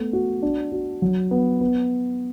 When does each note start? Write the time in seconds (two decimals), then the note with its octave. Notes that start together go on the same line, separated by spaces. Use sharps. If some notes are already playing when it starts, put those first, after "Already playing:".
Already playing: A3 B3
0.13 F#4
0.42 D4
0.72 F#4
1.02 F#3
1.31 B3
1.61 B3